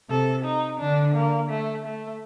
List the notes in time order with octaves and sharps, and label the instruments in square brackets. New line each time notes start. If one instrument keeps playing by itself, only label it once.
[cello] C3 [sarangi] A4
[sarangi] D#4
[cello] D3 [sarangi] D4
[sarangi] A#3
A3
A3